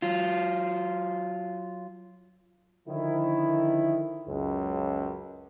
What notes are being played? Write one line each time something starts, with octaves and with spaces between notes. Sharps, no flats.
F#3 F4
D3 D#3 F3 E4
C#2 F#2